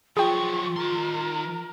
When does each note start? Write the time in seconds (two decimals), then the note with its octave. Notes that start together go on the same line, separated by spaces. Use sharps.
0.17 F3 F#3 F4 G#4 G5 C#6
0.76 D#3 A#4 C6